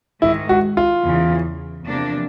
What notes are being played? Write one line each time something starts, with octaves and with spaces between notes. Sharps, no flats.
G#2 D#3 G#3 E4
F#4
F4
E2 C#3 E3
E2 C3 F3 A#3 D4